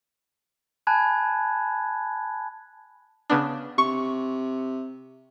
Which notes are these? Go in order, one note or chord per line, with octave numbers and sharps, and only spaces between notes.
G#5 A5 B5 F#6 G#6
C#3 B3 D4
C3 C#6